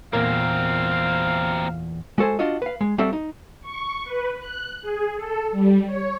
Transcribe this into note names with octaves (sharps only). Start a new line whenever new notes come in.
E2 A#2 A#3 C4 A#4 F5
G#3 F#4 A4 C5 G#5
D4 F4 F#4 D#5
B4 F5
G#3
G3 C4 F#4 A4 D5 E5
D#4
C#6
B4
F#6
G#4
A4
G3
C#5